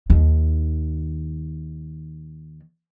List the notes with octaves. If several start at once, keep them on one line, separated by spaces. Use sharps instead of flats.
D#2 D#3